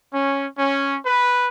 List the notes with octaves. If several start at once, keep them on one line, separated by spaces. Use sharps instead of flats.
C#4
C#4
B4